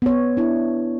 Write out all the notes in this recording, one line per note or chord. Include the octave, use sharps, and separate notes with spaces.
B3 C#5
D4 E4